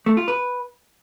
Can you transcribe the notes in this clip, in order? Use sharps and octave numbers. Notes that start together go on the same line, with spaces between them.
A3
F4
B4